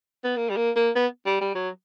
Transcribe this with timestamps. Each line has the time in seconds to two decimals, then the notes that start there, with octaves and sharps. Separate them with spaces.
0.24 B3
0.36 A#3
0.50 G3
0.56 A#3
0.76 A#3
0.96 B3
1.26 G3
1.41 G3
1.55 F#3